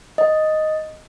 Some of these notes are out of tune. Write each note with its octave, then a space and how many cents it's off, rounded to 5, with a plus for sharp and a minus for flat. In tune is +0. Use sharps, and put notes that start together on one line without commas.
D#5 +0